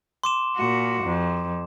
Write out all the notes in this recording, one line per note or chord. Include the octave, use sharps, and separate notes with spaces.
C6 D6 E7
A#2 F#4
F2